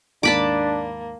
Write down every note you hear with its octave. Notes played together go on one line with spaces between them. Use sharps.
D#2 G#2 A#3 D4 A5 B5 D6